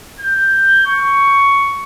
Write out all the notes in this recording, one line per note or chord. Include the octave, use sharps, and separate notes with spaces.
G6
C#6